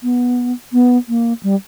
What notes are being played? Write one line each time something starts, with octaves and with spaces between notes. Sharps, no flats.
B3
B3
A#3
G3